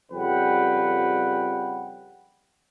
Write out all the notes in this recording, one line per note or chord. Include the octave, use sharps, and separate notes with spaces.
F2 C#3 G3 B4 F#5 G5